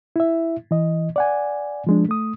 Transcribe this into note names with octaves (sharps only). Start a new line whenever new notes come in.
E4 E5
E3 D#5
D5 F#5 G#5
F3 G#3 D4
A3 D#6